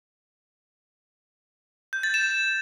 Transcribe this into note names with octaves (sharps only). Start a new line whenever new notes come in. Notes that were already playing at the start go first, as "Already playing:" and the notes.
G6
A6
E7